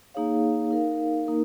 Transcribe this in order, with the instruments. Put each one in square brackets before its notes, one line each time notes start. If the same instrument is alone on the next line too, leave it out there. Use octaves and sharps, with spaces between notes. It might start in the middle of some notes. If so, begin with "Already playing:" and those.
[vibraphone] A#3 D#4 G#4 C#5 F5
D#4 A#4 F5
A#3 D#4 A#4